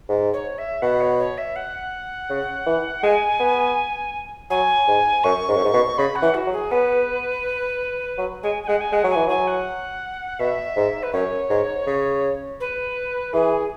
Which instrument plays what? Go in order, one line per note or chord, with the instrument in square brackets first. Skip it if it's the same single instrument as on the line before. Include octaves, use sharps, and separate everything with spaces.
[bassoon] G#2
[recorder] C#5
E5
[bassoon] B2 [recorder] F#5
[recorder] C#5
C#5
E5
F#5
[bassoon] C#3
E3
[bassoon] G#3 [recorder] G#5
[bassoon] B3
[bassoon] F#3 [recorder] G#5
[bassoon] G#2
[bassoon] F#2 [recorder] C#6
[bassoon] G#2
F#2
G#2
B2
[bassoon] C#3 [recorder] B5
[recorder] F#5
[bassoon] E3
[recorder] F#4
[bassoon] F#3
[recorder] G#4
[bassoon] B3 [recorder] B4
[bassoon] F#3
[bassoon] G#3 [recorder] G#5
[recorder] G#5
[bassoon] G#3 [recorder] F#5
[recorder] G#5
[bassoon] G#3 [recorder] F#5
[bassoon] F#3
[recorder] G#5
[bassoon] E3
[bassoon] F#3 [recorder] G#5
[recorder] F#5
[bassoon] B2 [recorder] E5
[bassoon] G#2
[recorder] B4
[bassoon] F#2 [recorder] C#5
[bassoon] G#2
C#3
[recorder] B4
[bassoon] E3 [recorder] G#4